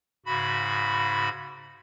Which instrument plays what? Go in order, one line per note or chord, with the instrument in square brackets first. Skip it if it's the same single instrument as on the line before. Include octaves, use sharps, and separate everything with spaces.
[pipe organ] G#2 C#3 F#4 B5